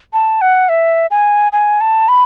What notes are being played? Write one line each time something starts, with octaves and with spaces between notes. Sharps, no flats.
A5
F#5
E5
G#5
G#5
A5
B5